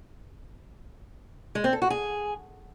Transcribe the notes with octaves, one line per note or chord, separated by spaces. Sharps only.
G#3
C4
A4
F#4
G#4